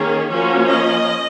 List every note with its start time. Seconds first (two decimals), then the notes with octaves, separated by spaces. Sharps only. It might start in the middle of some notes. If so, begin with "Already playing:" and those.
Already playing: D#3 A#3 C#4 G#4
0.30 F3 A#3 C#4 F#4
0.69 D#5